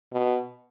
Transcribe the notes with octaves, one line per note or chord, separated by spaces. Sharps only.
B2